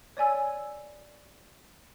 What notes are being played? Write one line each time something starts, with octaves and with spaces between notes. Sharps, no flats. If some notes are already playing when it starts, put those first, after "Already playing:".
C#5 D5 G#5 E6